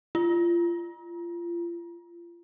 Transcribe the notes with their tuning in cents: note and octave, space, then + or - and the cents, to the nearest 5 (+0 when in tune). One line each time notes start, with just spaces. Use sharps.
F4 -30